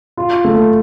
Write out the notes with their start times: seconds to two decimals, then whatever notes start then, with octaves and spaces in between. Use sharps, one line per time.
0.17 F4
0.45 A3